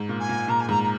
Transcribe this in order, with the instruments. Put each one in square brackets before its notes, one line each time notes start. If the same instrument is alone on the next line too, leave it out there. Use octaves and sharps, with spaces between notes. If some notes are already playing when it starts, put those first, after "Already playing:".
Already playing: [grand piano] G#2
A#2
[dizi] G#5
[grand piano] A#2
[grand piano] A#2 [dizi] A#5
[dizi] G#5
[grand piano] G#2 [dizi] A#5
[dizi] A#5